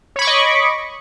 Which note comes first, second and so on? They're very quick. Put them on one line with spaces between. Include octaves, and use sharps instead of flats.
C#5 B5 C#6 D6 D#5